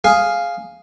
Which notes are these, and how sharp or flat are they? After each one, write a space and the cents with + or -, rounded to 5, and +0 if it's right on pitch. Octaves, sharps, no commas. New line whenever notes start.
G#4 +0 F5 +0